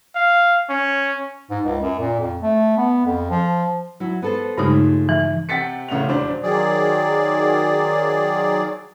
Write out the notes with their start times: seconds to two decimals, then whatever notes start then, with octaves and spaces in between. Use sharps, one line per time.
0.15 F5
0.69 C#4
1.50 G#2
1.64 C#2
1.81 F#2
1.99 A#2
2.20 F2
2.41 A3
2.77 B3
3.06 F2
3.31 F3
4.00 F#3 E4
4.22 B3 A4 C5
4.58 G2 C#3 G#3 A3 D#4 F4
5.09 E3
5.49 C3 F#5 G5 A6 B6 C#7
5.88 A1 C#3 A3 F#5 F7
6.08 E1 D4 C5
6.43 D#3 F#3 G#4 D5